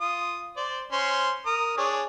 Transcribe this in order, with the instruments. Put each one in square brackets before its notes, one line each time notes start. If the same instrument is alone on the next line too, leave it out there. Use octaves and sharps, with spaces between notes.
[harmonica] F4 D#6
C5 D5
C#4 C5 C6
A#4 D#6
D4 G#4 C#5